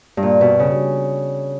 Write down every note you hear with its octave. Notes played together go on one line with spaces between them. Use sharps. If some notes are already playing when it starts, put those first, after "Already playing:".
G2
A#2
B2
C#3